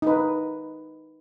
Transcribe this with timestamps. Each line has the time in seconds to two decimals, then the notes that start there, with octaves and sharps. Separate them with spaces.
0.02 D#4 B4